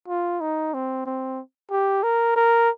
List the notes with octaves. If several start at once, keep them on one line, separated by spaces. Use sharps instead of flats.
F4
D#4
C4
C4
G4
A#4
A#4